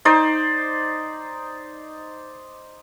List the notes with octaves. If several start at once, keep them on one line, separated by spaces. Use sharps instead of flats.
D#4 C5 D5